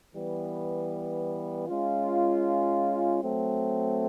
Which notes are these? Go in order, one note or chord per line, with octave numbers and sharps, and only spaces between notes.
E3 G3 B3
G#3 C#4 F4
F#3 A3 C4